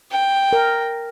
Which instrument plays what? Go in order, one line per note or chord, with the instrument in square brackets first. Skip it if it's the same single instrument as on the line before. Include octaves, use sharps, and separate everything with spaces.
[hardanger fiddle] G5
[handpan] A#4